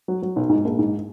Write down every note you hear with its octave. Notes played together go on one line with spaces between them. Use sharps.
F#3
F#3
B1
G#2
A#1
G#2